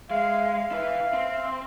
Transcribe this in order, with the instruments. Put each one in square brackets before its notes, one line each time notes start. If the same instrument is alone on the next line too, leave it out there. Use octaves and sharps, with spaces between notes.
[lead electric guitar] G#3 [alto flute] E5 [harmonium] F5
[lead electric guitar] E4 B4 [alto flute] E5
[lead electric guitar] C4